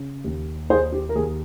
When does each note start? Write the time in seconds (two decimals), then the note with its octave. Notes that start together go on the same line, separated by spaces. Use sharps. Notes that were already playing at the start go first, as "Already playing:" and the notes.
Already playing: C#3
0.24 D#2
0.70 D#2 G#4 C5
0.92 G4
1.09 A#4
1.15 D#2 G#4